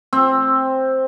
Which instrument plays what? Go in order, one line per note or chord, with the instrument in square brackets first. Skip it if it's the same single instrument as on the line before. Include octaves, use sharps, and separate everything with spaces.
[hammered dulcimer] C4